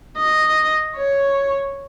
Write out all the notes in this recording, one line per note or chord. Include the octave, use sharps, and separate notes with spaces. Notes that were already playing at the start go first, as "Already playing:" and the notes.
D#5
C#5